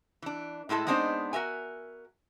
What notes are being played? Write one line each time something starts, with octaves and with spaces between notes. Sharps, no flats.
E3 D4
A2 G#3 E4 A4 A5
G#3 B3 C4 D4 D#4 C5
F#4 A#4 E5 G#5